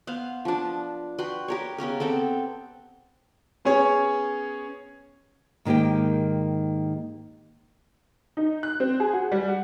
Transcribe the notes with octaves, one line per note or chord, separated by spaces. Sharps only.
B3 C5 F5
F3 D4
F#4 B4 G5 C6
G4 A#4 C#5
C#3 B3 C#4 A#4
B3 C4 A4 G5
B3 C#4 G#4 C#5
G#2 D#3 A#3 G4 G5
D#4
F#6
C4
G#4
F#4
G3
F#5